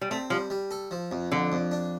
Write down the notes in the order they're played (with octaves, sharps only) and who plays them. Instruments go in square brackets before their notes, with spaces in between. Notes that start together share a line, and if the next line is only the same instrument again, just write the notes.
[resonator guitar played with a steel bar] G3
[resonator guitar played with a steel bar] A3 [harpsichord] C4
[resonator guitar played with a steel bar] F3 [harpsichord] G3
[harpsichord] G3
A4
F3
F2
[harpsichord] F2 [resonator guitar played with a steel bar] D3
[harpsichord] F2
D4